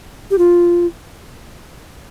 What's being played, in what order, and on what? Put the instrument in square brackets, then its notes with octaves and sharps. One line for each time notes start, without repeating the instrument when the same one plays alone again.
[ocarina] G4
F4